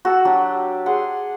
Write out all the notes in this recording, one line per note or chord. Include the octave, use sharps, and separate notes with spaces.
F#4 A4
F#3 D4 G4
G#4 F#5 C6